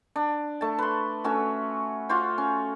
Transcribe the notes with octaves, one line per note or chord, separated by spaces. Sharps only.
D4
A3 A5
B4 C6
A3 C#4 F#4 E5
F4 F#4 C5
C#4